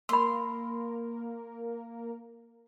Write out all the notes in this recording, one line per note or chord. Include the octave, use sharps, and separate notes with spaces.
A#3 A#4 B5 C6 E6